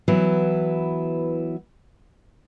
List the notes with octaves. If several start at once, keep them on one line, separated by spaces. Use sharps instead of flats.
E3 F#3 B3 E4